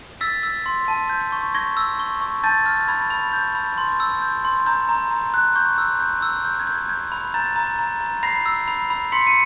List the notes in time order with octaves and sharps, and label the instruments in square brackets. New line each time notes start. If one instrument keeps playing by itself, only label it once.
[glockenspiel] E6 A6 B6
E6
C6
A5
G6
C#6
C#6 G#6 A#6
E6
C#6
C#6
A5 G6 A6
F6
B5 G#6
B5
G6
B5
C6
E6
G6
C6
A#5 G6
A#5
A#5
F#6
C#6 G6
E6
G6
E6
G6
G#6
G6
G#6
G6 G#6
B5
A#5 G6 A6
A#5
A#5
A#5
B5 A#6 C7
E6
B5
B5
C6 B6 C#7
C#7 D#7